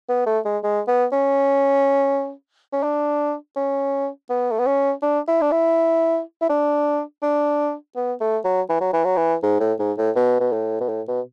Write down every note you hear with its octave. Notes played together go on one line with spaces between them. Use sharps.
B3
A3
G#3
G#3
B3
C#4
C#4
D4
C#4
B3
A3
B3
C#4
D4
E4
D4
E4
E4
D4
D4
B3
A3
F#3
E3
F#3
E3
F#3
E3
G#2
A2
G#2
A2
B2
B2
A2
B2
A2
B2